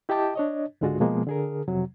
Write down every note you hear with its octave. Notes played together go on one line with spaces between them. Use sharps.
E4 G4 D#5 G5 A5 D6
D4 C#5 D#5
C#2 G#2 D3 G#3 F4 F#4
B2 F3 G#3 A#3 B3
D3 G#4 A#4
F2 C3 F#3